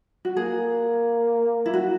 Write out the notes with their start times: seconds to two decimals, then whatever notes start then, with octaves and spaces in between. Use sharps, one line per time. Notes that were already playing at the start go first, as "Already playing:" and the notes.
0.25 F#4
0.36 A#3 G#4
1.66 E4
1.74 F#4